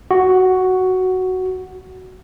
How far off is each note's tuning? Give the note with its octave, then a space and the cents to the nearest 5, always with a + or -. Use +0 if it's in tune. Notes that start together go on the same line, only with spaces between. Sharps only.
F#4 +5